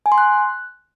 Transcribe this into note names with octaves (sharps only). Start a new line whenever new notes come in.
G#5
C6
F#6